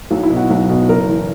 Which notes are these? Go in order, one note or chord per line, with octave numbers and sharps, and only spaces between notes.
B1 F#3
E4
B2
F#4
B1
B2
F#1 A#4
E3